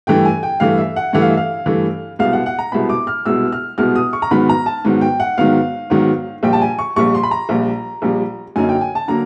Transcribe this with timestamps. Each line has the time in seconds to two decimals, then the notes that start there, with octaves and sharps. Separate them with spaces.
0.07 G2 E3 A3 G5
0.25 G#5
0.43 G5
0.60 G2 E3 A3 F5
0.78 E5
0.96 F#5
1.13 G2 E3 A3 F#5
1.22 F5
1.30 E5
1.37 F5
1.66 G2 E3 A3
2.19 C2 B2 G#3 B3 F5
2.33 F#5
2.46 F#5
2.59 A#5
2.72 C2 B2 G#3 B3 B5
2.89 D6
3.07 F6
3.25 C2 B2 G#3 B3 E6
3.52 F6
3.78 C2 B2 G#3 B3 F6
3.96 D#6
4.13 C#6
4.22 A#5
4.31 G#2 D#3 F#3 B3 B5
4.49 A#5
4.66 A5
4.85 G#2 D#3 F#3 B3
5.01 G5
5.20 F#5
5.38 G#2 D#3 F#3 B3 F5
5.90 G#2 D#3 F#3 B3
6.43 A#1 A#2 G3 G5
6.53 A5
6.61 G#5
6.79 C#6
6.96 A#1 A#2 G3 C#6
7.14 C6
7.23 B5
7.31 A#5
7.49 A#1 A#2 G3
8.02 A#1 A#2 G3
8.56 F#2 D3 F#3 A#3 D#4 G#5
8.69 G5
8.81 G#5
8.95 A5
9.08 D3 F#3 A#3 A#5